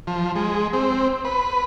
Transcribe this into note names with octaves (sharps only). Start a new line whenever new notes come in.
F3
G#3
C4
B4